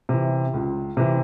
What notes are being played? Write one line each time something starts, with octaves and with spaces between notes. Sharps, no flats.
C3 E3
C#2
C3 E3